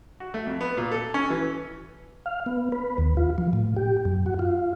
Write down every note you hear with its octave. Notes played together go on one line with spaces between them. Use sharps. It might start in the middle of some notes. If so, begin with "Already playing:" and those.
F#4
A3
F2
B3
A#2
A4
C#4
E3
F5
B3
B4
D#2
F4
F3
A2
G4
F#2
F#4
F4